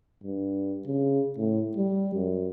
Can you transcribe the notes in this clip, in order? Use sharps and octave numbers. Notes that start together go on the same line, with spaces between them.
G2
C#3
A2
G3
F#2